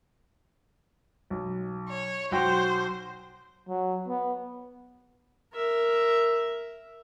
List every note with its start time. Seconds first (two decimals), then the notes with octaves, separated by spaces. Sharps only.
1.30 B1
1.89 C#5
2.31 B1 F#4 C5 G5
3.68 F#3
4.08 B3
5.53 A#4 E5